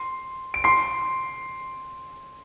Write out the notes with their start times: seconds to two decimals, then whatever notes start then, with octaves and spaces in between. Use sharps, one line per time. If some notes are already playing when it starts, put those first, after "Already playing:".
Already playing: C6
0.54 D7
0.64 C6 C7